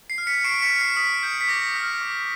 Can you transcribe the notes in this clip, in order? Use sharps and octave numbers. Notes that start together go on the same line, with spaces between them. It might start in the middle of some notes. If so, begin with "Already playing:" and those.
C7
F6
B6 C#7
C#6 C7 D7
B6 C#7
F6
C7
D#6 B6
G6
B6
D6 A#6
F6
D6